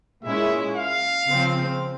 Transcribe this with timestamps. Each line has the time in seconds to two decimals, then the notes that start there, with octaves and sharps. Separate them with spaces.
0.24 A#2 G#3 C#4 E4 E5
0.76 F5
1.27 C#3 F3 C4